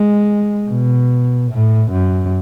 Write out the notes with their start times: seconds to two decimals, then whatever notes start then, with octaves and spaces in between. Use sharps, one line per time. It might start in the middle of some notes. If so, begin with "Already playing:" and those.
Already playing: G#3
0.69 B2
1.52 A2
1.92 F#2